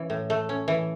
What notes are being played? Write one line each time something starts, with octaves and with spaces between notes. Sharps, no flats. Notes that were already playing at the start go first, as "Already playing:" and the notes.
Already playing: E3 C#4
A2
A3
C#4
E3